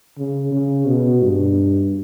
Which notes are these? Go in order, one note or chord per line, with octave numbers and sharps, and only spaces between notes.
C#3
C#3
B2
G2